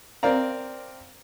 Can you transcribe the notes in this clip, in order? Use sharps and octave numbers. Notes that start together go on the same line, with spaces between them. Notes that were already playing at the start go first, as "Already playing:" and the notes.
C4 A#4 D5 F5 A#5